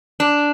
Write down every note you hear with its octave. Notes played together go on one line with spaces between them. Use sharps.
D4